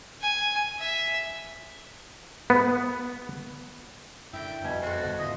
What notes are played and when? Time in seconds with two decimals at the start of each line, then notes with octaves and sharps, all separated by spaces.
0.21 G#5
0.79 E5
2.50 B3
4.33 F#2 D3 E4 G5
4.64 F2 B2 G3 G#5
4.82 F#4 A4 C5
5.04 G1 B3 F#5
5.19 E2 G#2 F4 D#5 E5